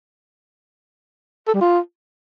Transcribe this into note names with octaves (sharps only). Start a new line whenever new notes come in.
A4
G3
F4